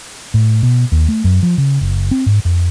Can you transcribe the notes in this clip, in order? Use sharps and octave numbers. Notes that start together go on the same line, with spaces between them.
A2
B2
D#2
A3
F#2
F3
C#3
F#1
C4
G#2
F2